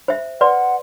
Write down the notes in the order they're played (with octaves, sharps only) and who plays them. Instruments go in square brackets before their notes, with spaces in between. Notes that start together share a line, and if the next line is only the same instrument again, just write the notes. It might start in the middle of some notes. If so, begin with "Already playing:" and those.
[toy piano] C5 E5
[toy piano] B4 D5 C6 [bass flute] F#5